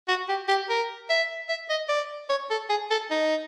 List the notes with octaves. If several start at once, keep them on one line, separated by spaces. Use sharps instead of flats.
F#4
G4
G4
A#4
E5
E5
D#5
D5
C#5
A4
G#4
A4
D#4